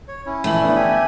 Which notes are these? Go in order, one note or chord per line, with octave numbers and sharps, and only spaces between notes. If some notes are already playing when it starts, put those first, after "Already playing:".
C#5
C#4 E4
A#1 E3 A3 F#7
D3 B3 D4
G4 E5 G#5